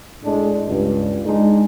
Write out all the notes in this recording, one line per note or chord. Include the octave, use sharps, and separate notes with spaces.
A2 G#3 D4
C#2 G2
G#3 D4 D#4